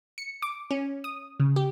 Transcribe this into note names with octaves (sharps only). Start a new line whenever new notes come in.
C#7
D6
C#4
D#6
C#3
G4